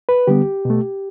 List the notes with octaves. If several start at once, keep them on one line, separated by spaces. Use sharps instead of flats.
B4
D3 G3 B3 G4
B2 A3